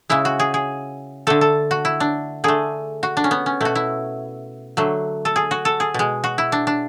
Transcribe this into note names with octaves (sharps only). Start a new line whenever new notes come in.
C#3 G#3 E4
F#4
G#4
G#4
D3 A3 A4
A4
F#4
E4
D4
D3 A3 G#4
F#4
D4
C#4
B3
C#4
B2 A3 F#4
E4
D3 F#3 A3
A4
G#4
F#4
A4
G#4
B2 G#3
F#4
E4
D4
D4